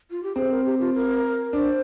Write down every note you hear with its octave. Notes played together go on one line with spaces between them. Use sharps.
F4
G4
C4 G#4
A#4
G4
F4
A#4
D4 C5